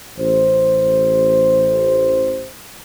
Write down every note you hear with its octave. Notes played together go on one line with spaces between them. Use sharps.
A1 C5